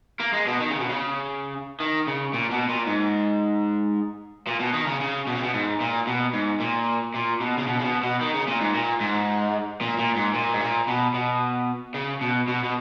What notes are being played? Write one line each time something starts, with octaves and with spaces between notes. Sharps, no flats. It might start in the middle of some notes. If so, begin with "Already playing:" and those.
A#3
G#3
B2
D#3
C#3
B2
C#3
D#3
C#3
A#2
B2
A#2
G#2
A#2
B2
D#3
C#3
C#3
B2
C#3
B2
G#2
A#2
B2
G#2
A#2
A#2
B2
C#3
B2
C#3
B2
B2
D#3
C#3
A#2
G#2
A#2
G#2
A#2
A#2
G#2
A#2
G#2
A#2
B2
B2
C#3
B2
B2
B2